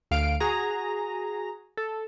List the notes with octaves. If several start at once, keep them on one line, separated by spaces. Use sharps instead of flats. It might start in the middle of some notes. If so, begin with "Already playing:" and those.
D2 F5 D7
F#4 G#4 A#5
A4